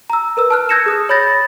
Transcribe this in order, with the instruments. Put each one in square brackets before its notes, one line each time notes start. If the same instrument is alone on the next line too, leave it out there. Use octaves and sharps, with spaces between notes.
[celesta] A#5 E6
A#4 B4 E6
A5 F6 F#6
E6 G6 G#6 A#6 C#7 E7
G#4 D#6 F#6
C#5 B5 G6 A6 A#6